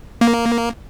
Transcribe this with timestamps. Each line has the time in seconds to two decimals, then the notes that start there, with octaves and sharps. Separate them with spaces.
0.21 A#3